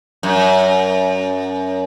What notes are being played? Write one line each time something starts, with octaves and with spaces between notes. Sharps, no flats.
F#2